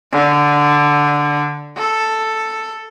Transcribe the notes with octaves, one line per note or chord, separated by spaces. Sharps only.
D3
A4